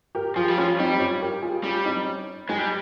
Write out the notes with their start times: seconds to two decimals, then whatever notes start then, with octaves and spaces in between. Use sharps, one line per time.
0.15 G4 A#4
0.36 F3 F4 G#4
0.48 G3
0.57 F3 C#4 F4
0.79 G3 C4 D#4
1.00 C#4 F4
1.22 G4 A#4
1.42 F4 G#4
1.64 G3 C#4 F4
1.85 C4 D#4
2.07 C#4
2.49 G#3 D#4 G4
2.58 G3